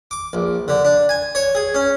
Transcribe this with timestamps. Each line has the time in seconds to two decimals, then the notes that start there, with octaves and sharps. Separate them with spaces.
0.11 D6
0.33 A#1
0.68 D3
0.85 D4
1.09 G#5
1.35 C#5
1.55 G#4
1.74 C#4